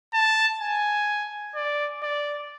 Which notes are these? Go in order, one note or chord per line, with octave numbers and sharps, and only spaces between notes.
A5
G#5
D5
D5